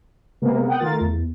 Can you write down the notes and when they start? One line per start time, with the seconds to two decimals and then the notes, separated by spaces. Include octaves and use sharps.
0.42 C3 G#3 A#3 B3
0.68 F#5 G5 D#6 F#6
0.79 D#3 A3 F4 A#4 A6
1.01 E2